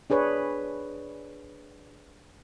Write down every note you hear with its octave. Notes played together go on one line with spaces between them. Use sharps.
D4 G#4 B4 C#5